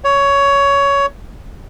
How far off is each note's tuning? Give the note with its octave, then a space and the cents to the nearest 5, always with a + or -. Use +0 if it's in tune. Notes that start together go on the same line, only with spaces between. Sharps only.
C#5 +15